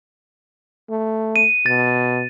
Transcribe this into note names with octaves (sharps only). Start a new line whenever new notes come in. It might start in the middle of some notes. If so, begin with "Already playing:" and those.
A3
D#7
B2 A6